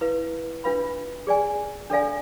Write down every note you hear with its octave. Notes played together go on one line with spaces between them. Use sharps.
E4 B4 F5
D4 F4 B4 F5 B5
G#4 D5 G#5
D4 A4 D5 F5 G#5